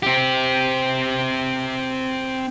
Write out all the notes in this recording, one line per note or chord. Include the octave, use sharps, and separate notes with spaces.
C4 G4